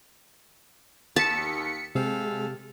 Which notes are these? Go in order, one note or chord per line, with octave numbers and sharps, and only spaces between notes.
D#2 A5 B6 C#7
C3 G#3 G4 A4 F5